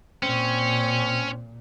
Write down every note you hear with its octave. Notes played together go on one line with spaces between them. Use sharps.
A#2 C4 C#4